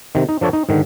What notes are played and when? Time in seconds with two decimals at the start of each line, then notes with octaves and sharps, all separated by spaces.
0.15 C3 D#3
0.29 D#4
0.41 F3 D4 A4 C#5 D5
0.53 D#4
0.69 G#2 D3 D#3